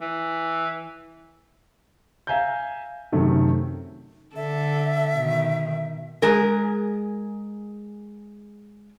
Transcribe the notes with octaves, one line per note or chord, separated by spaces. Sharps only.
E3
E5 F5 G#5 A#5 G6
F#2 C3 D#3 A3
D3 A4 E5
B2 D#3
G#3 G#4 A#4